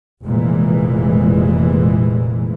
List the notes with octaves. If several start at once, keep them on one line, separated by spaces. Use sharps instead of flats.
F1 A#2 E3 G#3